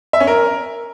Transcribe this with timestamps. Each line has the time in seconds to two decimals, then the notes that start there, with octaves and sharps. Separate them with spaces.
0.13 E5
0.20 C#4
0.27 A#4